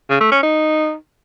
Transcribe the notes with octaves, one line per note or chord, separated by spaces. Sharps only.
C#3
A3
C#4
D#4